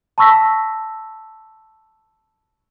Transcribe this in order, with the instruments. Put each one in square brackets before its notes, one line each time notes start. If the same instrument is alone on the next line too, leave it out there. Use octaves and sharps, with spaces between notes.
[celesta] A5 B5 C#6 E6 A#6 B6